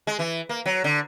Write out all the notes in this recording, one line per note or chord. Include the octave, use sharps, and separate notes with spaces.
G#3
E3
A#3
F#3
D3